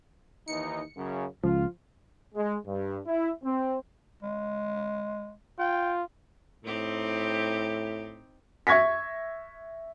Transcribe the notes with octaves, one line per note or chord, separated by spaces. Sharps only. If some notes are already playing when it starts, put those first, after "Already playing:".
D#2 E3 D#4 C#7
F#2 C#3
C#2 F3 F4
G#3
G2
E4
C4
G#3
F4 G5
A2 C4 D#4 G4
E5 C#6 G#6 A#6 B6